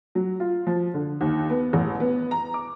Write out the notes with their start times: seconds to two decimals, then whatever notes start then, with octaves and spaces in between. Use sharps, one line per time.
0.15 F#3
0.40 F4
0.67 F3
0.94 D3
1.21 D#2
1.50 B3
1.73 A1
2.00 B3
2.31 A#5
2.54 D6